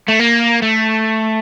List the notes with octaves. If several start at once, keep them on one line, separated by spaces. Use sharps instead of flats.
A3
A#3
A3